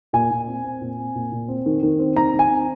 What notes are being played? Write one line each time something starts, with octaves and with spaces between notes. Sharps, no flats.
A#2 G#5
A#2
C4
C4
A#2
C4
A#2
A#2
C4
D#3
D#3
C4
D#3 A#5
D#3
G#5
C4